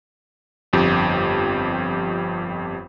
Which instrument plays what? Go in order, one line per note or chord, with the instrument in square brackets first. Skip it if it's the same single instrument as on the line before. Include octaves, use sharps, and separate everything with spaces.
[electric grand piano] G1 F2 G4